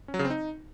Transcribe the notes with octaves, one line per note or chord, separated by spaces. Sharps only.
C#4
F#3
C#3
C4
D#4